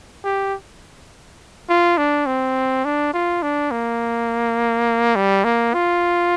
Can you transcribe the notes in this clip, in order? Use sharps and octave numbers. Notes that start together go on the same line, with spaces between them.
G4
F4
D4
C4
D4
F4
D4
A#3
G3
A#3
F4